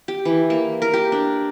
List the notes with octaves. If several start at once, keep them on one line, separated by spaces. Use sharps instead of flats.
G4
E3
A#3
A#4
G4
D4